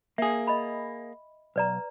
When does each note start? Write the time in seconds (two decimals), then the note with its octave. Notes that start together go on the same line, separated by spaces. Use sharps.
0.18 A#3 G#4 E5
0.47 D#5 B5
1.56 B1 B4 D5 A#5